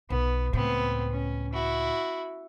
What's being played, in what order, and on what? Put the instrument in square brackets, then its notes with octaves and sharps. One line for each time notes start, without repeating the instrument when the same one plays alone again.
[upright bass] B1 [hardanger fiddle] B3
[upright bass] C#2 A2 [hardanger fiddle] B3 C4
[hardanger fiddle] C#4
E4 F#4